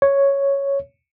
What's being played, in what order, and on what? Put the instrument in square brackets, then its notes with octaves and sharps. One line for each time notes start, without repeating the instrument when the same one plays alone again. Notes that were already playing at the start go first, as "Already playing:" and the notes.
[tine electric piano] C#5